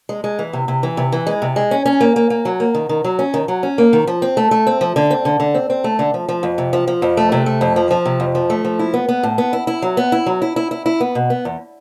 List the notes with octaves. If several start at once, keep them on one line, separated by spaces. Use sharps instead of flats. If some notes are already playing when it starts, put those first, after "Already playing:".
G#3
G#3
E3
C3
C3
E3
C3
E3
G#3
C3
G#3
C#4
C#4
A#3
A#3
A#3
F#3
A#3
D#3
D#3
F#3
C#4
D#3
F#3
C#4
A#3
D#3
F3
C4
A3
A3
C4
F3
D3
C4
D3
D3
C4
C4
A3
D3
F3
F3
F2
C3
F3
F3
F2
A3
C3
A3
F2
F3
F3
C3
F2
F3
A3
F3
E4
B3
B3
A2
B3
E4
E4
F#3
B3
E4
F#3
E4
E4
E4
E4
B3
B2
B3
E2